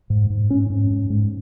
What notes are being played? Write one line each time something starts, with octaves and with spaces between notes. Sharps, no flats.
G#2
G#2
G#2 C#4
G#2
G#2
G#2